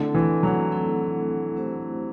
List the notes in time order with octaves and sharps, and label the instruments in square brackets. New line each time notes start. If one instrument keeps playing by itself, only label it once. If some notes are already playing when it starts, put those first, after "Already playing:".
Already playing: [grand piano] D3 [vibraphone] A3 C4 E4 A4
[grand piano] E3
F#3
[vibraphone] A3 C4 E4 A4
A3 C4 E4 G4 C5